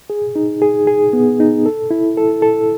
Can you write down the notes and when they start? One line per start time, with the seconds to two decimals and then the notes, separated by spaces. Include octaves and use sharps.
0.10 G#4
0.36 D#4
0.62 G#4
0.87 G#4
1.13 B3
1.40 D#4
1.66 A4
1.91 E4
2.17 A4
2.42 A4